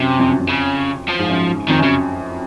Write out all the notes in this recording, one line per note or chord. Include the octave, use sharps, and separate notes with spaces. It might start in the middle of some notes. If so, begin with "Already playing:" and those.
Already playing: F#2 C3
F2
F#2
F2
C#3
F3
G#2
F#2
F2 D#3
F#2
C#3